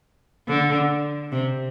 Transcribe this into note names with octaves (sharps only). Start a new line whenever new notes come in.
D3
C3